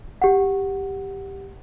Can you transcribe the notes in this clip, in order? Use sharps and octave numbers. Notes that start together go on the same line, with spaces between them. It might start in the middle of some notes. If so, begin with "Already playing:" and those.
G4 F#5